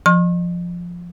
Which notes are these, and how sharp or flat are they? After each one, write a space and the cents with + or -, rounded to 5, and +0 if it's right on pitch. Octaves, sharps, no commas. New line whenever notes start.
F3 +0 C#6 -45